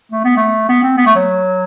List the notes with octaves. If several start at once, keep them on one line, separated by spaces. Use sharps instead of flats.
A3
B3
A3
B3
C4
B3
A3
F#3